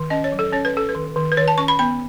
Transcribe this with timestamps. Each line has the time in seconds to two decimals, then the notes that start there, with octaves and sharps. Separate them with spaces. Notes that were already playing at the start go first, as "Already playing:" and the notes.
Already playing: D#3
0.10 C#4 D#5
0.24 C#5
0.32 F#3
0.39 A4
0.53 C#4 C#5
0.65 B4
0.74 C#4 A4
0.89 B4
0.95 D#3
1.16 D#3
1.32 B4
1.37 D#3 C#5
1.48 A5
1.58 C#4 C#6
1.68 B5
1.79 B3 B5